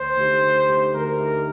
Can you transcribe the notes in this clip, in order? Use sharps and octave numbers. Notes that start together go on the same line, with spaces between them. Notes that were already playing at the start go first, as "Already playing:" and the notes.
Already playing: D2 C5
D3 A3 D#4 G4
D2
D3 A3 D#4 G4
D2 A#4
D3 A3 D#4 G4